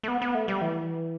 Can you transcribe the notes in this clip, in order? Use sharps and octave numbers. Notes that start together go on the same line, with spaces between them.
A3
B3
B3
A3
G3
E3